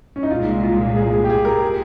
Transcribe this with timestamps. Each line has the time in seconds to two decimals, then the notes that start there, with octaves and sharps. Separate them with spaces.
0.16 C#4
0.23 D#4
0.30 C2 A#2 G#3 F4
0.63 F4
0.96 G#4
1.13 G#4
1.24 G4
1.30 G#4
1.45 A#4
1.61 G#4